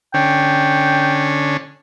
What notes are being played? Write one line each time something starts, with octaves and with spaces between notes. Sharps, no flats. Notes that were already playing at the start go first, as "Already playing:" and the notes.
D3 C#4 G5